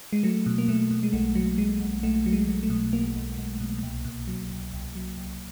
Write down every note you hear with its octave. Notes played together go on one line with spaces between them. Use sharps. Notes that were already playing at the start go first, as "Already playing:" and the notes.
G#3
F#3 A3
B2
A#3
B2 A3
B2
G#3
B1 A3
F#3
F#3 G#3
B1
B1 A3
F#3
G#3
F#3
A3
B2
B1 A#3
B1
B1
B2
C2
B2
F#3
C2
C2
F#3
C2